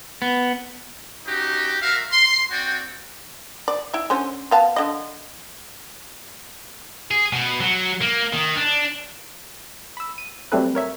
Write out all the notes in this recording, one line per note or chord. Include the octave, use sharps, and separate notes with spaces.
B3
C#4 D#4 F#4 G4
F#4 A#4 E5 F5
C6
C4 F#4 D5 G5
D5
E4 E5
D3 C#4 C5
B3 F5 A5
D3 D#5
G#4
B2
F#3
A#3
D#3
D4
B5 E6
D#7
F#3 G3 A3 C4 A4 B4
A#4 C#5 E5